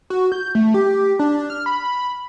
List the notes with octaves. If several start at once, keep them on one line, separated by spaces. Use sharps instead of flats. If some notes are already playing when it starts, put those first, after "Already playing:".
F#4
G6
A3
G4
D4
F6
B5